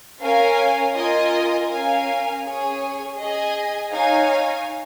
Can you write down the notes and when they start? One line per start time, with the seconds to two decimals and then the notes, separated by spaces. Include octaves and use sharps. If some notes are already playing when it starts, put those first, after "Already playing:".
0.21 C#4 A#4 F5 G#5
0.95 F4 A#4 D#5 G#5
1.70 C#4 A#4 F5 G#5
2.44 C#4 G#4 C#5 G#5
3.18 G#4 D#5 G#5
3.93 D#4 C#5 F5 G#5